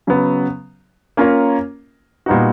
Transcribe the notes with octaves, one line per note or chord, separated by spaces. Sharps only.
C#3 F#3 B3
A#3 C#4 F4 A#4 C#5
A#2 G3 B3 D#4 F#4